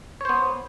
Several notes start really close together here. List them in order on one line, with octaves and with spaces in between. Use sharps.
C#5 C5 B3